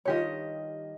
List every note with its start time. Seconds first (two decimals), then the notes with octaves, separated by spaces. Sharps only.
0.05 G2 D#3 F4 G4 C#5 D#5